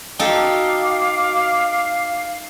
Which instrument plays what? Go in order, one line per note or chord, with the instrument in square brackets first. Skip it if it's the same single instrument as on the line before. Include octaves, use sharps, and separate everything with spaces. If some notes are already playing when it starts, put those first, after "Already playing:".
[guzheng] D#4 A4 [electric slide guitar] F#4 G5 [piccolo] F5 [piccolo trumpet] D6